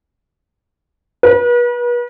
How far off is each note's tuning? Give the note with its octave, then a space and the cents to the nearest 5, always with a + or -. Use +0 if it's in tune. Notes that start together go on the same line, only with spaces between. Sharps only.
B4 -40